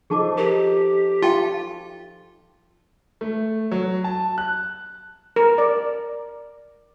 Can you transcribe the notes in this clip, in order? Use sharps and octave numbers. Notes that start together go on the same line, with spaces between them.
F3 D#4 G#4 A4 A5 D6
G4 A#4
F4 F5 G5 A5
A3
F#3
A5
F#6
A#4
D5